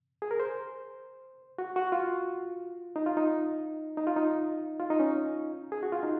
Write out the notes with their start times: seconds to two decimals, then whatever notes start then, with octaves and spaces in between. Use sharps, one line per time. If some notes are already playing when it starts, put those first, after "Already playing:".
0.22 G#4
0.31 A#4
0.40 C5
1.58 F#4
1.76 F#4
1.92 F4
2.96 D#4
3.06 F4
3.17 D#4
3.97 D#4
4.07 F4
4.16 D#4
4.79 F4
4.90 D#4
5.00 C#4
5.72 G#4
5.83 F#4
5.92 F4
6.03 D#4